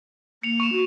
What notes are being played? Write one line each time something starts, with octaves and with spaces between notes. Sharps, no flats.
A#3 C#7 F7
C#6 E7
F#4